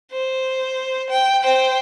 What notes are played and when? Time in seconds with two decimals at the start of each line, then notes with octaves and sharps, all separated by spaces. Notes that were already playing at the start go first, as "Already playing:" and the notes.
0.11 C5
1.10 G5
1.43 C5 G5